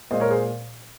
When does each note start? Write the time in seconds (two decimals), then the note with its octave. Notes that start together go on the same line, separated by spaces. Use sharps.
0.11 A#2 G#3 C5 D#5
0.20 A#4 C#5
0.30 G#4 C5